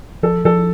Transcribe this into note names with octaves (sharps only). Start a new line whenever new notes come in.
F3 A4
F3 A4